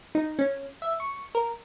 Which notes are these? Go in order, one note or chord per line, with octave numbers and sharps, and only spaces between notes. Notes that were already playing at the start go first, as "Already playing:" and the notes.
D#4
C#4
E5
C#6
A#4